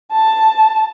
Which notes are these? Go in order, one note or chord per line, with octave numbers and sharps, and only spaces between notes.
A5